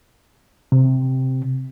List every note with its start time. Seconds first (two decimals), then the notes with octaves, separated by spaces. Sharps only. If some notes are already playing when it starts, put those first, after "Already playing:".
0.72 C3